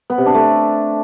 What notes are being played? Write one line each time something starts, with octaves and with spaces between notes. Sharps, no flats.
B3
C3
D4
A3